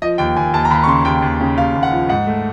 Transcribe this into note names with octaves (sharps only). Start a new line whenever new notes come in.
F3 D#5
D#2 G5
D#2 G#5
D#2 A5
A#5
D#2 B5
C#6
C#3 C6
D#2 G5
D#2
C#3
D#2 F5
D#2
F#5
F3
G#2 F#5
A3